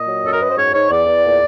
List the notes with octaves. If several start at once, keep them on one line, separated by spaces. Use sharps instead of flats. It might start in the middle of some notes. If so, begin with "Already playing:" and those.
Already playing: A#2 D#5
F#3
F#2 A4
A#4
F#2 B4
C5
G#2 C#5
G#2 C#5
E2 D5
E2
A#2